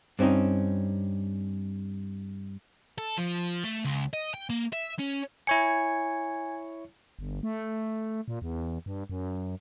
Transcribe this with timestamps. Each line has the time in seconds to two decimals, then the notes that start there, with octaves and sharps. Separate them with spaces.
0.19 G2 C4 C#4 D#4
2.98 A4
3.17 F3
3.64 A3
3.85 C#2
4.13 D#5
4.34 G5
4.50 A#3
4.73 E5
4.99 C#4
5.47 E4 C#5 G#5 G#6 C#7
7.19 G1
7.43 A3
8.28 A#2
8.42 E2
8.86 G2
9.10 F#2